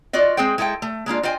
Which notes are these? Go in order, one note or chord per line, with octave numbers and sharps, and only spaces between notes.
F4 F#4 D5 D#5
G#3 C4 G#4 C5 G5
G#3 E4 A4 A#4 G5
A3
G#3 A#3 D4 F4
F4 C5 D#5 G5 G#5